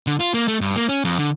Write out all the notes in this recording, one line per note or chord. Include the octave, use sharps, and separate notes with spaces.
D3
F4
A#3
A3
G2
A#3
C#4
F2
D3